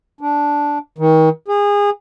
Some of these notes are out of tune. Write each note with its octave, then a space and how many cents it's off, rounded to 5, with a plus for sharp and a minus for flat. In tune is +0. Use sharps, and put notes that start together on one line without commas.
D4 -10
D#3 +35
G#4 -25